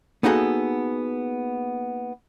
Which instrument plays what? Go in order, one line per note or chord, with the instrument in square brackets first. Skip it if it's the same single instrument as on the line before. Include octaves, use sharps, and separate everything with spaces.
[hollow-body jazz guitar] A#3 B3 D#4 F#4 G#4 A4